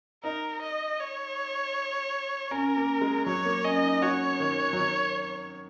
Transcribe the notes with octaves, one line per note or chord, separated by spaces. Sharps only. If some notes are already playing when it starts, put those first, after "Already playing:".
D#4 A#4
D#5
C#5
C#4 A#4
A#3
G#3
F#3 C#5
A#3
C#4 D#5
D#4
F#4 C#5
D#3
F#3
D#3